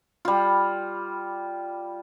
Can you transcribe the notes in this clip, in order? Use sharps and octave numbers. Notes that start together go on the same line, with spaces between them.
G3 F4